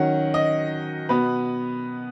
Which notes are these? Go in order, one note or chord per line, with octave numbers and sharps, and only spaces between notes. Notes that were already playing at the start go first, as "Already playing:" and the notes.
Already playing: D#3 F#3 C#4 F#5
D#5
B2 B3 B4